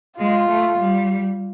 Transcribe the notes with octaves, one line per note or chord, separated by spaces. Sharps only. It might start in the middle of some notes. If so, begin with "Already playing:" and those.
G#3 F4
A3
G3